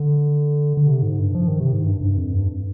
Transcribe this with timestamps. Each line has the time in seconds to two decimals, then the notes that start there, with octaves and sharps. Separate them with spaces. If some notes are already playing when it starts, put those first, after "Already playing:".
Already playing: D3
0.77 D3
0.87 C3
1.02 G#2
1.19 G2
1.35 F3
1.48 D#3
1.60 C3
1.73 G#2
1.85 G2
2.01 G2
2.17 F2
2.33 G2